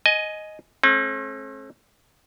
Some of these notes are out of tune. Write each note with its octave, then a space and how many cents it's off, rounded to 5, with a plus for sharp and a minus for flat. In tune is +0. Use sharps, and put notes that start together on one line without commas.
D#5 +0 G#5 +20
A3 -35 C4 +45